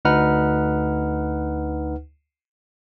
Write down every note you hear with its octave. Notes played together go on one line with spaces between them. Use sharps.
D2 D#4 B4 F#5 F6